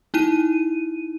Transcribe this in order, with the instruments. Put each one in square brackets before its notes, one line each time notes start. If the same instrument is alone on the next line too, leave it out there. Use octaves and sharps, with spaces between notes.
[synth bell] D#4 E4 D#7